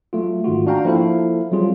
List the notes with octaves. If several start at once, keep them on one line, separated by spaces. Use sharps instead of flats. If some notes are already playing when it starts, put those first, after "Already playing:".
F#3 A3 F4
G#2 D#3 F4 F#4
D4 F#4 F5 G5 A#5
F3 A#3 E4 A4 F5
F#3 G3 C4 F4 G#4